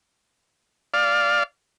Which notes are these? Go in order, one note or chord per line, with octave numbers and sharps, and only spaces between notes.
D5 F5